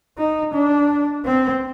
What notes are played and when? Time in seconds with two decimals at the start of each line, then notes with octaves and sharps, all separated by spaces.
0.18 D#4
0.54 D4
1.25 C4